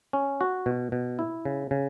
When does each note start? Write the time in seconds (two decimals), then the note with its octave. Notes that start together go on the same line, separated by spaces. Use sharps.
0.13 C#4
0.41 F#4
0.66 B2
0.92 B2
1.19 E4
1.45 C#3
1.71 C#3